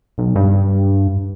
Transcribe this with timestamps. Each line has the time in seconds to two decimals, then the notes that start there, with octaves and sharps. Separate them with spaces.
0.18 B1
0.36 G2